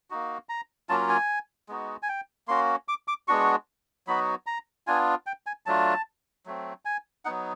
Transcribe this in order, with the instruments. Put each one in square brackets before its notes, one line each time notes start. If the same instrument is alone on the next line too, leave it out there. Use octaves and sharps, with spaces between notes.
[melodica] A#3 D#4 F#4
A#5
F#3 A#3 C#4 F4 A5
G#5
G#3 B3 D#4 F#4
G#5
G5
A#3 C#4 F#4 C6
D6
D6
G#3 B3 D4 F#4 C#6
F#3 B3 D#4 F#4 B5
A#5
B3 D4 F4 G#5
G5
G#5
F#3 A3 D4 F4 A5
F#3 A3 C4
G#5
F#3 B3 D#4 F#5